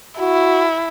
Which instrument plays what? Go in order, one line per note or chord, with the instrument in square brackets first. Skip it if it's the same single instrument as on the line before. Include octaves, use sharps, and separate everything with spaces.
[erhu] E4 [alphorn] F#4